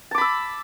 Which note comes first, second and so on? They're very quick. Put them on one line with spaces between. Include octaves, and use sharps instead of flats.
A5 D6 B5 E6